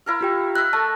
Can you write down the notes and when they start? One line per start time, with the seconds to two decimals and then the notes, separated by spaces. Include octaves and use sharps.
0.06 E4 A#4 F5
0.21 F4 G4 G5
0.55 D#5 E5 F#6
0.73 A3 A5